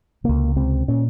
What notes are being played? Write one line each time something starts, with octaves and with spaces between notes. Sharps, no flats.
C#2 C3 A#3
C#2 C3 C4
A#2 C#4